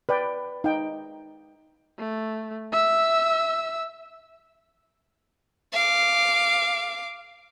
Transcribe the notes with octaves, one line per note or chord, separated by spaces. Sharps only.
B4 D5 G5
D#4 G5
A3
E5 E6
F5 D6